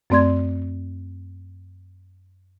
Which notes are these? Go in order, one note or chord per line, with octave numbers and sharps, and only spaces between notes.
F#2 A3 C4 D5 C6 G#6